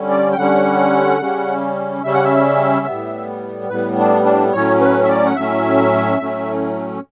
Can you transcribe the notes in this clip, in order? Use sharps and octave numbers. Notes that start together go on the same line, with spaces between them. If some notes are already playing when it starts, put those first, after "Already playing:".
Already playing: D3 G3 C#4
D5
G5
D3 G3 C#4 F#5
C#3 G3 C#4
C#3 G3 C#4 E5
F#5
E5
A2 G3 B3
A2 G3 B3 B4
D4
D4
A2 F#3 C#4 C#5
B4
E5
D5
F#5
A2 F#3 C#4 E5
A2 F#3 A3 C#4